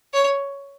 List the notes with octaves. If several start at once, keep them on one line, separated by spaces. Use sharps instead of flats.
C#5